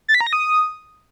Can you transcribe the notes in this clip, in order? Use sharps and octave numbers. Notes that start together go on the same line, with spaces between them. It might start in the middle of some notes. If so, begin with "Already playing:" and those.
A6
B6
A#5
A#6
D#6